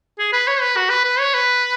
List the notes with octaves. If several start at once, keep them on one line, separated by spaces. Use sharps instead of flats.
G#4
B4
C#5
B4
F#4
B4
B4
C#5
B4